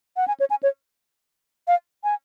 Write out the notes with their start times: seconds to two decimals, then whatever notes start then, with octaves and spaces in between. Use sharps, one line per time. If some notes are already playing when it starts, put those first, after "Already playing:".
0.17 F#5
0.28 G#5
0.40 C#5
0.50 G#5
0.63 C#5
1.68 F5
2.04 G#5